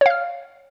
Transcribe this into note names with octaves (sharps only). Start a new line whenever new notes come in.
C#5 F5 F6